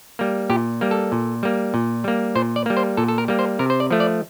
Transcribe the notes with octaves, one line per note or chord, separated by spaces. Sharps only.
G3 A#3
A#2 G4
G3 A#3
A4
A#2
G3 A#3
A#2
G3 A#3
A#2 C5
D5
G3 A#3
C5
A#2 A4
A4
A#4
G3 A#3
C5
C3 A#4
C5
D5
F3 A3
D5